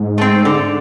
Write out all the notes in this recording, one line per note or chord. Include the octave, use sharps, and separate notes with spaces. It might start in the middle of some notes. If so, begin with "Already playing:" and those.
Already playing: G#2
A3 C4
D3